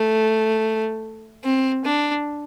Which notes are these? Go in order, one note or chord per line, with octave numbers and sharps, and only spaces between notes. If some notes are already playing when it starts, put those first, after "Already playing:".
Already playing: A3
C4
D4